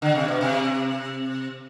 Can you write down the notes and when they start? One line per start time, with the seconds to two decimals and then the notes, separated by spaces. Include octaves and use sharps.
0.02 D3
0.15 C3
0.28 B2
0.41 C3